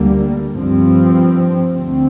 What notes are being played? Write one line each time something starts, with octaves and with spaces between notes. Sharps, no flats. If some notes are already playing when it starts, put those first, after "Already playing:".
Already playing: D2 D3 G3 A#3
G2 F3 C4
D2 D3 A3 C4